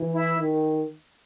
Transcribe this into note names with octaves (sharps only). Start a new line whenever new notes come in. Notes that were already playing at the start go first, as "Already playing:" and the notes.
Already playing: E3
E4
D#3